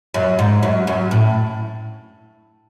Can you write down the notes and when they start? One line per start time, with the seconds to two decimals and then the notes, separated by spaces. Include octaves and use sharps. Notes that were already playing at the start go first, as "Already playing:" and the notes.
0.14 F#2
0.39 G#2
0.63 F#2
0.87 F#2
1.11 A2